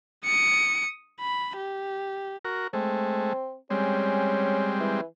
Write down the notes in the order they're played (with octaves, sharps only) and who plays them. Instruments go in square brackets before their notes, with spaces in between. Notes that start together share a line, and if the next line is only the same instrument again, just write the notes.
[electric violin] D#6 C#7
B5
G4
[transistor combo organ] F#4 A#4
[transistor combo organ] G#3 A3 [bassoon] C4
[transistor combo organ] G3 G#3 C4 [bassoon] C#4
[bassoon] E3